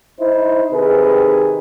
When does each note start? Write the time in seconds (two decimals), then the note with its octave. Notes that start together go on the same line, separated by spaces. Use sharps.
0.20 D#4 E4 C5
0.71 C3 D#3 G#4 B4